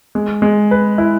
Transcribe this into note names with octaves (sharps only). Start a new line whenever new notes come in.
G#3
G#3
B4
E4